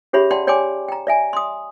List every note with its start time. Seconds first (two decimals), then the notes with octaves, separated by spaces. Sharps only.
0.13 C#4 G4 G#4 C#5 E5 B5
0.31 D5 F#5 G5 A5 C6
0.47 C#5 D5 G5 G#5 C6 D6
0.88 G5 A#5
1.07 D5 E5 G#5
1.33 C6 D#6